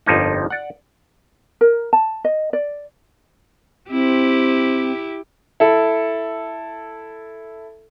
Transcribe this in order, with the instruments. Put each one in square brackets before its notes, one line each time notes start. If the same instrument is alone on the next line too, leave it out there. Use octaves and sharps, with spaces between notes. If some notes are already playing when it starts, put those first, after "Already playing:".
[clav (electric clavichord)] G1 F2 F3 A#3 D#4
D5 F#5
[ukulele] A#4
A5
D#5
D5
[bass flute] C4 [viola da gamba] E4 G4
[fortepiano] E4 A4